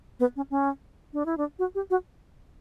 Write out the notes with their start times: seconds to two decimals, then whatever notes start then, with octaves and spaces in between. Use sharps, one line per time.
0.20 B3
0.36 C#4
0.51 C#4
1.13 D4
1.26 E4
1.38 D4
1.59 F#4
1.75 G4
1.90 F#4